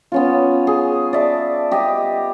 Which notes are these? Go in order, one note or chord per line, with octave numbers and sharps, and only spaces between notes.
B3 C#4 F4
G#4
D5 E5 A5
G4 D#5